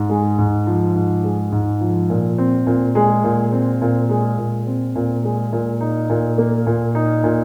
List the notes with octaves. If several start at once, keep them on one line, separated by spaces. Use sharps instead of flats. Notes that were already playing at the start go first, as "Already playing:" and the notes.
Already playing: G#2
G#3
G#2
F3
G#2
G#3
G#2
F3
A#2
C4
A#2
G#3
A#2
C4
A#2
G#3
A#2
C4
A#2
G#3
A#2
D#4
A#2
A#3
A#2
D#4
A#2